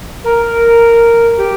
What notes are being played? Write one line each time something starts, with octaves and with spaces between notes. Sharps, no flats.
A#4
G4